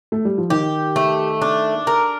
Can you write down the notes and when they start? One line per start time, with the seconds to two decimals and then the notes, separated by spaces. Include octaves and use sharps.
0.12 A3
0.25 G3
0.38 F3
0.50 D#3 G4
0.96 A3
1.42 D4
1.87 A#4